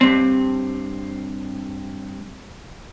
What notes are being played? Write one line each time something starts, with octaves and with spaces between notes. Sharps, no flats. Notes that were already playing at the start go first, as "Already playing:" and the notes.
G2 C4